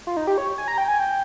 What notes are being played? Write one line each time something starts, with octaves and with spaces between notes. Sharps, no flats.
F4
D#4
G4
C#5
G#5
A#5
G5
G#5
G5